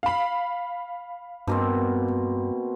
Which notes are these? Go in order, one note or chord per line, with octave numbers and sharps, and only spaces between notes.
F5 B5
G2 B2 A#3 C4